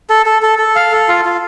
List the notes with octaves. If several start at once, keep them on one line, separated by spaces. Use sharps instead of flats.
A4
A4
A4
A4
F5
A4
F4
F4